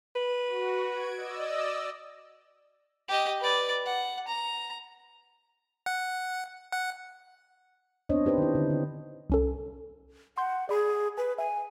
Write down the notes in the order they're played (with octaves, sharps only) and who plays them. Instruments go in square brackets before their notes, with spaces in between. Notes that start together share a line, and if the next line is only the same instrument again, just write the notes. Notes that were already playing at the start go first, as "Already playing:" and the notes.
[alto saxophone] B4 [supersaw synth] D#7
[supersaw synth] F#4
G#6 D7
D5 D#5 E6
[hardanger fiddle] G4 D#5
B4 D5
F#5
A#5
[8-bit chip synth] F#5
F#5
[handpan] B3 C4 D4 C5 C#5 D#5
D#4 G4 B4 C5
D#3 E4
D3
C4
[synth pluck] C2 C#4 A4
[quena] F#5 [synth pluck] C6 G6
[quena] G#4 [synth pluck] D5 B5
[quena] B4 [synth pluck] G#5
[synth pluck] E5 [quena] G#5